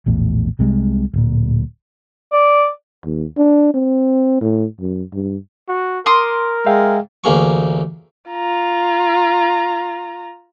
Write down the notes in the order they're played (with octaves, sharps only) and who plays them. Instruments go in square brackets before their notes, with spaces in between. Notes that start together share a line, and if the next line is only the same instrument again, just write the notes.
[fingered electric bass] A#1 E2 A2
C2 C3 G3 G#3
D1 A#2
[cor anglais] D5
[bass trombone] D#2
D4
C4
A2
F#2
G2
[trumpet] F#4
[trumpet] A#4 [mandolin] C6 D6 D#6
[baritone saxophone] G#3 [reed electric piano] E5 F5 G5
[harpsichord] A1 D2 A#3 G#4 C#6
[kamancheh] F4 A#5